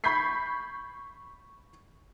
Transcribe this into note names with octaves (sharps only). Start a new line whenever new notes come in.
B5 C#6 G6 G#6 B6 C7